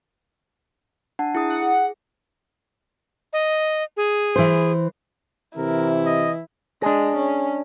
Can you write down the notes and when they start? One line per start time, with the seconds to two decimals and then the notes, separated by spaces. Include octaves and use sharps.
1.19 D4 F#5 A5
1.35 E4 G#4 D#6
1.50 F#5
1.62 G#4
3.33 D#5
3.97 G#4
4.36 E3 C5
5.57 C3 E3 E4 A#4
6.06 D#5
6.82 G#3 D4 G#4
7.16 C#4